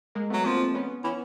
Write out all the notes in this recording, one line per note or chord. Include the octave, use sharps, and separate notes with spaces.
G#3 A#3
F#3 A3 B3
F3 A#3 C4
B3 C#4
E3 B3 C#4